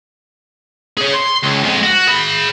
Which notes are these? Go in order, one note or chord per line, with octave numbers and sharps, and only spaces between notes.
G#4 C#5
C6
C#2
F2 G#3
F#4
G#4 B5